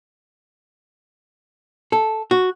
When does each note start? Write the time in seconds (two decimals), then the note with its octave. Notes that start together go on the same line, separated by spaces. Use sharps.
1.92 A4
2.31 F#4